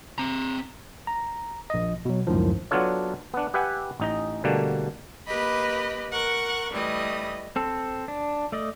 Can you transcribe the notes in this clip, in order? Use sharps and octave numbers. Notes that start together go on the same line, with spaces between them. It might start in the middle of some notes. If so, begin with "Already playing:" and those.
C4 A#5
A#5
A#1 D#5
B2 F#3
C#2 F#2 A2 D#3 F3
F#3 B3 D4 F4 A4 C#5
B3 D4
G4 B4 E5 F#5 G#5
A1 D#4 D#5
B2 D3 G3 A3 A#3
A#3 G4 B4 D#5 B5
A#4 F#5 C#6 F#6
E3 G3 A3 D#5 D#6
C4 A4
D4
A3 D5 D#5